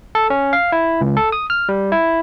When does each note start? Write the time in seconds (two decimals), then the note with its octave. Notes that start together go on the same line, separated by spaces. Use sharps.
0.15 A4
0.30 C#4
0.53 F5
0.72 E4
1.01 C#2
1.17 A4
1.32 D#6
1.50 F6
1.69 G3
1.92 E4